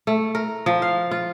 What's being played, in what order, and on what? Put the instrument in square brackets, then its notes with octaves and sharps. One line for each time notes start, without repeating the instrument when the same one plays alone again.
[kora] A3
A#4
F3
F5
F4